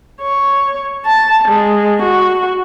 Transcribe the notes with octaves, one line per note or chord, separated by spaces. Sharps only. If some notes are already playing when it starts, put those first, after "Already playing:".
C#5
A5
G#3
F#4